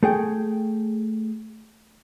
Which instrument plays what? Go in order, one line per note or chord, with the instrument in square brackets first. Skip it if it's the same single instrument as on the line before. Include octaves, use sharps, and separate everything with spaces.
[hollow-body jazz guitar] A3 G#4 G5